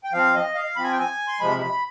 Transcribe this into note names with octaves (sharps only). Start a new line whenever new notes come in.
G5
F3 C4 F5
D#5
F5
F3 C4 B5
G#5
G5
G#5
C6
C3 F3 G#3 B5
B5